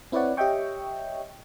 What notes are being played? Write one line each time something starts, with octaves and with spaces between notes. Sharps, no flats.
C4 E4 B4 C#5 D5 F#5
G4 C#5 D#5 E5 G5 C#6